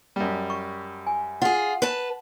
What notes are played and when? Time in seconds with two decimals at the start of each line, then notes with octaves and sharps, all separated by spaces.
0.16 F#2 G3
0.50 C#6
1.07 G#5
1.42 F4 G#4 F#5
1.82 B4 A5